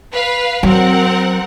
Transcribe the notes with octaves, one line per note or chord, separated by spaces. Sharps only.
B4 F5
F#3 C4 A#4 F#5